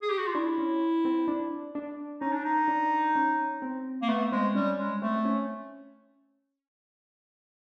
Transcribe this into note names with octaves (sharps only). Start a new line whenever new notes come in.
G#4
G4
F#4
F4
D4 E4
C#4
C4
D4
D4
C#4 D#4
D4
D#4
D4
C#4
C4
A#3
A3 B3
G#3 C4
G3 C#4
G#3 C#4
A3 C4
C4
C#4